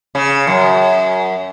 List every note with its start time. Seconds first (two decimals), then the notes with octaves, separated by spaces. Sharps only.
0.15 C#3
0.47 F#2